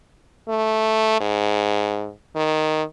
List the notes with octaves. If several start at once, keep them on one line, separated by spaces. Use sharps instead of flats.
A3
G#2
D#3